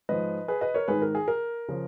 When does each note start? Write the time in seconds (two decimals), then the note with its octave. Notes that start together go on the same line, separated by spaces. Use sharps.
0.09 G#2 F3 B4 D#5
0.48 G#4 B4
0.61 B4 D#5
0.74 A#4 C#5
0.88 G#2 D#3 G#4 B4
1.02 A#4
1.15 G#4
1.28 A#4
1.69 C#3 F3